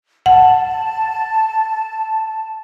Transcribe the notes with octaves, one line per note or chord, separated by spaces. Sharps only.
F#5 A5